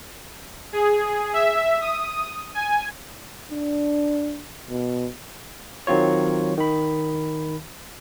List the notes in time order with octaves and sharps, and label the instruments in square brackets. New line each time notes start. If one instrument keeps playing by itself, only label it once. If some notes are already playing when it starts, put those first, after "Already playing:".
[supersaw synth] G#4
E5
D#6
G#5
[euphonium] D4
B2
[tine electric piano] D#3 F#3 C4 F4 C#5
D#3 B5